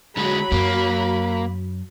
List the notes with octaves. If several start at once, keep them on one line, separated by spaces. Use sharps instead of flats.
D3 F#3 G#3 B5
F#2 A#3